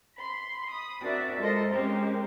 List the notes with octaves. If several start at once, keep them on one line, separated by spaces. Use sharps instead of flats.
B5 C6
B5 D#6
C4 D4 F#4 A#4 D5 E5
G#3 F4 A4 A#4 C5 D#5
G#3 C4 C#4 G4 A#4 C5